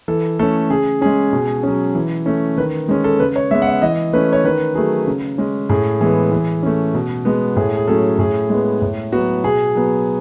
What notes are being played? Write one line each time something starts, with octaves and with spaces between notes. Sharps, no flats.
E3 A4
A3 C#4 A4
C#3 G#4
G#3 C#4 G#4
B2
F#3 C#4
E3
A3 C#4
D#3 B4
G#3 C#4
A4
C#3 B4
C#5
G#3 B3 E5
F#5
E5
E3 D#5
A3 C#4 B4
C#5
D#3 B4
F#3 A3 G#4
C#3
G#3 C#4
A2 G#4
E3 G#3 B3 G#4
E3
A3 C#4
B2
G#3 B3
A2 G#4
G#4
F#3 A3 C#4 A4
A2 G#4
G#3 B3
A2
F#3 B3 F#4
B2 G#4
F#3 B3